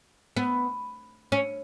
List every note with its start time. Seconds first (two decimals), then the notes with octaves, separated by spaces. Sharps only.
0.37 B3
1.32 C#4